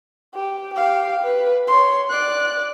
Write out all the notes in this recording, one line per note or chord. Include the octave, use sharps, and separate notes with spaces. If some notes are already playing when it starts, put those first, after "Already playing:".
G4
G4 F5
B4
C#5 C6
D5 F#6